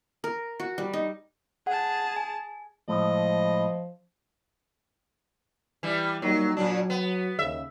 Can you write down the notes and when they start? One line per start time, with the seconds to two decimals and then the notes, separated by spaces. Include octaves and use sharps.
0.24 A#4
0.60 F#4
0.78 G3
0.94 D#4
1.67 G#4 F#5 A5
2.16 G#5
2.88 A2 F3 G#3 D#5
5.83 E3 G3
6.22 F#3 G3 A#3 D#4
6.57 A#2 F#3 D4
6.90 B3
7.39 D#2 C#3 E5